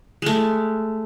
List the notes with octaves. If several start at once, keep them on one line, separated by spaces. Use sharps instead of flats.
G#3 A3